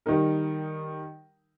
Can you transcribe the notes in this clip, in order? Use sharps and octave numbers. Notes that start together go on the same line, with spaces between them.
D#3 G3 D#4 A#4